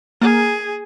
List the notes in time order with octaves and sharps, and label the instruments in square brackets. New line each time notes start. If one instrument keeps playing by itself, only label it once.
[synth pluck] A#3 [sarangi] G#4